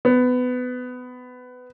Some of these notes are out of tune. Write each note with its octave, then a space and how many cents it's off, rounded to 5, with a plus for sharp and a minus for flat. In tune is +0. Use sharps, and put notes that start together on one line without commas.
B3 +20